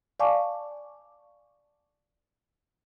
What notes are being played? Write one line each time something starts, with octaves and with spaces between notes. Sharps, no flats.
D5 F5 G#5 A5 C#6 D6